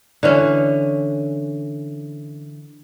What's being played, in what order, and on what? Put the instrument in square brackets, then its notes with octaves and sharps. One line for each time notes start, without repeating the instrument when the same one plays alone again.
[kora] D3 E3 C#4